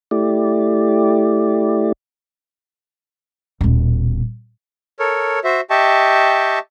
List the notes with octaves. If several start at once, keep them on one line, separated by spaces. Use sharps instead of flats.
A3 E4 G4 D5
D#1 B2
A4 A#4 C#5
F#4 C5 E5
G4 D#5 E5 G5 A5 C#6